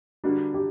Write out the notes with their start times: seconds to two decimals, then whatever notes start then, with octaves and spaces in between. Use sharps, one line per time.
0.24 D3 G3 A#3 D4 F#4
0.54 G4